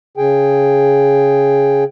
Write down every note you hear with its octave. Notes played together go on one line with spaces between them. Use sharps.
C#3 G#4 G5